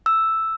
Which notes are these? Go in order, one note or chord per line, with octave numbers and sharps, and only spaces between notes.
E6